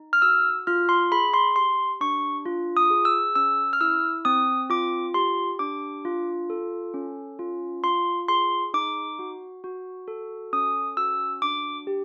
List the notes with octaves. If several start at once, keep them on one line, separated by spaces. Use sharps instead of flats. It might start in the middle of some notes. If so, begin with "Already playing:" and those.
Already playing: D#4
F6
F#4 E6
F4 F6
C6
G#4 B5
C6
G4 C6
D4 C#6
F4
D#6
G#4
E6
C#4 E6
F6
E4 E6
C4 D#6
F4 D6
G4 C6
D4 D6
F4
A4
C#4
F4
F4 C6
G#4 C6
D#4 D6
F#4
F#4
A4
C#4 D#6
F#4 E6
D4 D6
G4